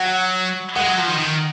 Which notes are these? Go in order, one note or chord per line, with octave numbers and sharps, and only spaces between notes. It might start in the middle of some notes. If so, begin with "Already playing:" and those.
Already playing: F#3 F#5
G#3 F#5
F#3
F3
D#3
D#3